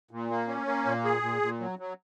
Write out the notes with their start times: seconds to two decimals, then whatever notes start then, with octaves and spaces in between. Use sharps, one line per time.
0.11 A#2
0.30 A#3
0.48 C#4
0.67 A#3
0.86 A#2
1.04 G#4
1.22 A#2
1.42 A#2
1.60 F#3
1.79 F#3